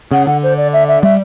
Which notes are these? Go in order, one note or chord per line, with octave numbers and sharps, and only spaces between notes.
C#3 F#5
D3 F#5
C5
D5
E5
E5
G3 E5